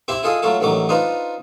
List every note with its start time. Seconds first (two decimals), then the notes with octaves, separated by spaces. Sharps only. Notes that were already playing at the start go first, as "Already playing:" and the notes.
0.08 C4 E4 G4 C5 E5
0.23 E4 F4 G#4 A4 D#5
0.42 F#3 A3 F4 A4 A5
0.60 A1 D3 D#3 F#3 A3 D6
0.89 D4 D#4 F4 B4 C5 A#5